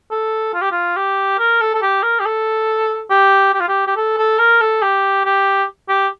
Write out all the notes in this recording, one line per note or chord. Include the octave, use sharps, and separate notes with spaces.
A4
F4
G4
F4
G4
A#4
A4
A4
G4
A#4
G4
A4
G4
G4
F4
G4
G4
A4
A4
A#4
A4
G4
G4
G4